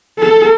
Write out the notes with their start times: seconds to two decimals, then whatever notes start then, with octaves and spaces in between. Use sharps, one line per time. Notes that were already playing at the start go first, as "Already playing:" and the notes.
0.19 A4